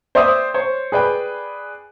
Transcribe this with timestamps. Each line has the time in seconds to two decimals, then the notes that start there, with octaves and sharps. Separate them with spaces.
0.15 C5 D5 E5 G5 C6 D#6
0.54 C5 C#5
0.92 G#4 B4 D5 G5